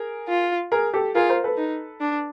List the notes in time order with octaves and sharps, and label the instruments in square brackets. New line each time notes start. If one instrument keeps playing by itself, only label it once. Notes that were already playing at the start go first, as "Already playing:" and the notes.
Already playing: [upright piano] G#4 A#4
[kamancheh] F4
[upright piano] G#4 A#4
G4 A4
[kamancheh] F4 [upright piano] G#4 A#4
[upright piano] A#4 C5
A4 B4
[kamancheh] D#4
D4